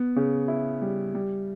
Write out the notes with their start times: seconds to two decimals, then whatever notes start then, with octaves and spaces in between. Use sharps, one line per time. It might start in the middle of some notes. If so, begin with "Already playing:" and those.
Already playing: B3
0.16 C#3
0.48 E4
0.82 G3
1.14 G3